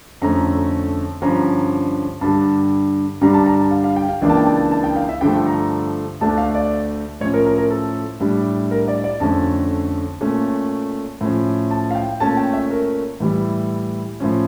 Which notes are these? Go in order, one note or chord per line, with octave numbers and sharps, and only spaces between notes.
F2 D3 A3 C#4 A#5
G2 D3 F3 C#4 A#5
G2 D3 G3 A5
G2 D3 G3 D4 A#5
A5
A#5
A5
F5
F5
G5
F5
C#2 C#3 E3 A#3 D4 G5
A5
G5
A5
A5
G5
F5
E5
G2 D3 F3 A3 G5
A#5
D2 D3 A3 D4 A5
F5
D5
A2 F3 C#4 C#5
A#4
A#4
A#4
A4
A2 G3 D4
A#4
D5
D5
F2 D3 A3 C#4 A5
A#2 A3 C#4
A2 F3 C#4
A5
F5
G5
A#2 A3 C#4 A5
G5
E5
A#4
A2 E3 G3
A2 F3 C#4